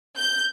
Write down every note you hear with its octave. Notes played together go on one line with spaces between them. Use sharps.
G6